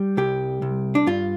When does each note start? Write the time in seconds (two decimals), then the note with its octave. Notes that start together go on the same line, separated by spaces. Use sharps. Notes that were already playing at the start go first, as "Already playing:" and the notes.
Already playing: G3
0.17 C2 G4
0.62 C2
0.95 D4
1.07 G2 F4